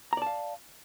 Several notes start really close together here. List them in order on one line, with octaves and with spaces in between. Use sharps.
A#5 D5 A5 F5